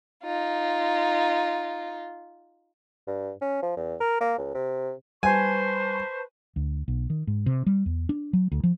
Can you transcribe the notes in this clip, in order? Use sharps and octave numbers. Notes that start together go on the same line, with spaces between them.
D#4 F4
G2
C#4
F3
E2
A#4
A#3
C#2
C3
G3 B4 C5 G#5 A5 C#6
D2
B1
D#3
G#2
C3
G3
E2
D4
F#3
D2
F3